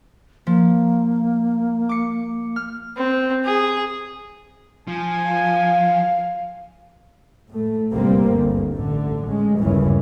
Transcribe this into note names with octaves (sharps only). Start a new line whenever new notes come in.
F3 A#3
D6 C#7
F6
C4
G#4
F3 G#5
F5
A2 A3
G1 C2 G2 G3 A#3 C4
G1 D2 G2
A1 D3
G#3 C#4
G1 D#2 C#3 E3 C#4